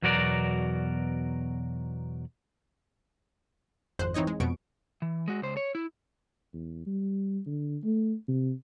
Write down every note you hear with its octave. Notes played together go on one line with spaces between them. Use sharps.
E2 B2 F#3 F#4 A#4 D5
G#1 F2 C5 F#6
E3 C4 D#4 C#5 D#5
G#3
F2 B2 C#6 D7
E3
G#3 F#4
C#2 C5
C#5
E4
E2
G3
D3
A3
C3